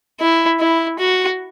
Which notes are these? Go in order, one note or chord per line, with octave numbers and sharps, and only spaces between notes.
E4
E4
F#4